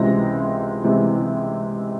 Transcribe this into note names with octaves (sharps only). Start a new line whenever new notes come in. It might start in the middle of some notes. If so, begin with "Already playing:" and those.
Already playing: C#2 C3 E3 G#3 C4 A#6
C3 E3 G#3 C4